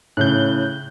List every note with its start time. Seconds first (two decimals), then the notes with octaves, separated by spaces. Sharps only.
0.17 A2 C#3 F#6 G6